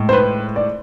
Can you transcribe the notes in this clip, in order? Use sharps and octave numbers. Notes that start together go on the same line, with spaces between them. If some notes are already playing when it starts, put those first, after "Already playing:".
Already playing: A2 G#3
C5
B4
D5